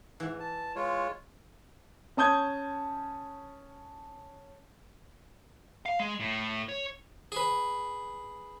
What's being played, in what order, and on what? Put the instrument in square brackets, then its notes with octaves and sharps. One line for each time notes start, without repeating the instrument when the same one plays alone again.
[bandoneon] G#2 [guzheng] E3
[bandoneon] A5
G#3 F4 C#5
[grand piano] C#4 A5 D#6 G6 G#6
[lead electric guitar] F5
G#3
A2
C#5
[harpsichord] G#4 B4